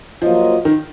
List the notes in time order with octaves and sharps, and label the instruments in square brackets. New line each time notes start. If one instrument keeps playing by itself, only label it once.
[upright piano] F3 [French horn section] F#3 A#3 F4 C5 D#5
[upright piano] D#3